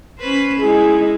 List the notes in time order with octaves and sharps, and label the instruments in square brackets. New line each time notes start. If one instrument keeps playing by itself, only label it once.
[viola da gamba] C#4 B4 C5
[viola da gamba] G#3 D#4 E4 [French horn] G#4